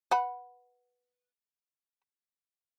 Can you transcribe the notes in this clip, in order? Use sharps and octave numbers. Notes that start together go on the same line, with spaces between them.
B4 F#5 B5